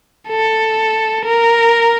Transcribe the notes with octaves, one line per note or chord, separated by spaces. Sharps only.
A4
A#4